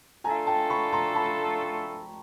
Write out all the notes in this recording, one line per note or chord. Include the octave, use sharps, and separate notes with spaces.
A3 D4 F4 A4 G#5 A#5
G5 A5
B5 C#6
A#5 C6
A5 B5